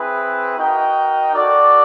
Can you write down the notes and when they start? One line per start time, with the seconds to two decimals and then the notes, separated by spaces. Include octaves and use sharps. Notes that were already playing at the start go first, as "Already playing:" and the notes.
Already playing: C4 E4 G#4 B4
0.58 D#4 F#4 A#4 D#5 G5
1.35 F#4 A4 D5